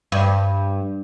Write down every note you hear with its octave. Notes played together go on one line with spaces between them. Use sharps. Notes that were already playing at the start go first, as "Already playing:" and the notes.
G2